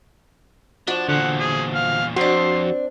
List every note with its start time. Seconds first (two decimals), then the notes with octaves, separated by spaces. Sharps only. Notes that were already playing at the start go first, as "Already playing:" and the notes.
0.87 F3 D4 F#4
1.08 E2 A#2 D3 F#5
1.39 G#4
1.74 F5
2.16 F2 C4 D4 F#4 C6